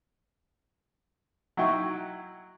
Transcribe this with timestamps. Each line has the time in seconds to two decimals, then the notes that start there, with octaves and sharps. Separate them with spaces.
1.57 F#3 D#4 E4 F#4 G5 C#6